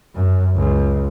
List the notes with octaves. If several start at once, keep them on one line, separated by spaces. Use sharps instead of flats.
F#2
C#2